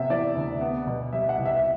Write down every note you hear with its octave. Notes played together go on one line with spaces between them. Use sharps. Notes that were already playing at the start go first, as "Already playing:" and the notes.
Already playing: C3 B3 E5
E3 D5
D2
B3
B2
G3 E5
F#5
C2
E5
E5